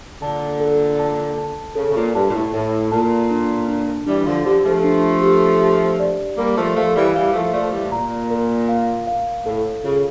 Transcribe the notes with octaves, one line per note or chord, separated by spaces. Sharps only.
A#2 D3 A5
A4
A5
A5
C#3 A4
C#3
A#2
G2 A5
A#2
A2
A2 A4
A#2 A5
D4
D4
E3 G3 D4
D3 F3
D3 F3 G4
F3 A3
D4
G4
G4
D5
G3 A#3 A#4
F3 A3
F3 A3 F5
E3 G3
E3 G3 F5
F3 A3
F3 A3 D5
E3 G3
A2
A#2 A#5
A#4
F5
F5
A2 A4
C#3 F4